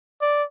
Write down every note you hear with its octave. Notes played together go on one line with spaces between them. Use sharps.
D5